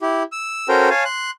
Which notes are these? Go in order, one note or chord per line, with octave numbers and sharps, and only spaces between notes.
E4 G4
E6
C#4 F#4 A4 A#4 C5 G5
C#5 F5 G#5 A5
C6 F#6